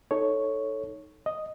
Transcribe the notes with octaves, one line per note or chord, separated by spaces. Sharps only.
D#4 A4 C#5
D#5